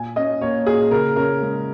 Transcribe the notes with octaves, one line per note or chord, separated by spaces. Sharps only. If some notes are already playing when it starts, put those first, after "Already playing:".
Already playing: A#2 G#5
C#4 D#5
A#3 C#5
A#2 G#4
C#3 A#4
C#4 A#4
G#3